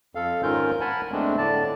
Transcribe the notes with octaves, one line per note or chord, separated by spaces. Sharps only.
F2 A4 F5
G#2 D#3 C#4 F4 A#4 G6
A#4 F#5 G#5 A5 B5
E2 G#3 A3 C4 D4
A2 D3 D5 A5